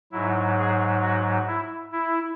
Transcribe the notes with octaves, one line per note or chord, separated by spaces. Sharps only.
G#2 F#3 E4
G#4
F#4
E4
E4